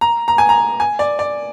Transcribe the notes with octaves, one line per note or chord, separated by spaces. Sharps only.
A#5
A#5
G#5
A#5
G#5
D5
D5